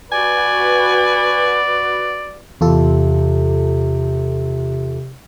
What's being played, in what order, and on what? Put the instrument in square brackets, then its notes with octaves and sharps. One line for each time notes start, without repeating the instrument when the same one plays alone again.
[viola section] F#4 B4 [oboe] D5 [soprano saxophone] G#5
[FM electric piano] E2 F4 A4 [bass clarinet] C3